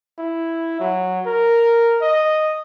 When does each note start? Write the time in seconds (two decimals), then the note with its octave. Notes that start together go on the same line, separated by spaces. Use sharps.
0.18 E4
0.80 F#3
1.26 A#4
2.02 D#5